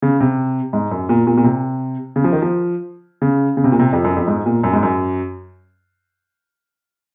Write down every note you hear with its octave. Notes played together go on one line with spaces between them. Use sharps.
C#3
C3
G#2
F#2
A#2
A#2
A#2
C3
C#3
F3
D#3
F3
C#3
C#3
C3
A#2
C3
F2
F#2
F2
G#2
A#2
F#2
G#2
F#2